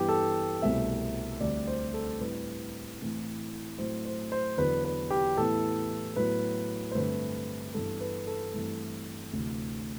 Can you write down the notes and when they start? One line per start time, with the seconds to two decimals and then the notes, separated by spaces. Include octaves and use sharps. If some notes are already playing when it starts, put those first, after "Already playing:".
Already playing: G2 E3 B3 G4
0.09 A4
0.62 C2 B2 A3 C4 E5
1.40 D2 D3 G3 C4 D5
1.67 C5
1.94 A4
2.20 A2 G3 C4 B4
2.99 A2 E3 A3 C4
3.78 A2 F#3 A3 C4 C5
4.05 C5
4.32 C5
4.57 E2 D3 F#3 B3 B4
4.84 B4
5.10 G4
5.37 A2 E3 B3 A4
6.16 A2 F#3 B3 B4
6.92 C5
6.95 G2 D3 A3 C4 B4
7.74 G2 E3 B3 A4
8.01 B4
8.27 A4
8.54 G2 E3 A3 C4
9.33 D2 C3 E3